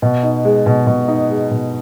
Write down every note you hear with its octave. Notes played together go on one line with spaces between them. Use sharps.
B2
D#4
G#3
B2
B2
D#4
G#3
B2